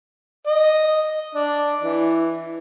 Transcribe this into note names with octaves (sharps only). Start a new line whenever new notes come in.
D#5
D4
E3